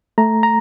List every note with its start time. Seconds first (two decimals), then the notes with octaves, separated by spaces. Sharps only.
0.18 A3 A#5
0.43 A#5